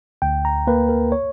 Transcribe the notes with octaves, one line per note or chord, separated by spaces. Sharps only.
D2 G5
A#5
A#3 B4
A#4
C#5